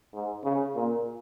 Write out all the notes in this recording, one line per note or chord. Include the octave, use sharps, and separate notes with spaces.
G#2
C#3
A#2